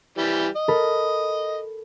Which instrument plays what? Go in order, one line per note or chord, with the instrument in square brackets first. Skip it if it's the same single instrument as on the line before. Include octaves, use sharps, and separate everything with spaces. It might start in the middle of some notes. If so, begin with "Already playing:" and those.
[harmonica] E3 G3
D#5
[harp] A4 A#4 B5